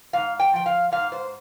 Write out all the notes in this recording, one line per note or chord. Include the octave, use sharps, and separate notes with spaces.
G#2 F5
G5
F3 G5
F5
G#2 F5
C5